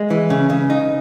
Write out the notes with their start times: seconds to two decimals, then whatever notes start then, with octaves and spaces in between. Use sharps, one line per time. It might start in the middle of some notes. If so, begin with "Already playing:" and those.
Already playing: G#3
0.10 E3
0.30 C#3
0.50 C#3
0.70 D#4